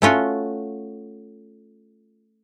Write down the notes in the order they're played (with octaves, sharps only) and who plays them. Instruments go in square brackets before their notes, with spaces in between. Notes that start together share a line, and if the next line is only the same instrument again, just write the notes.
[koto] A3 C#4 F4 F#4